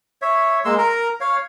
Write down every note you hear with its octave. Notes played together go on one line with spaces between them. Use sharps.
C#5 E5
G#3 A#3 C6 E6
A#4 A#5
C#5 F5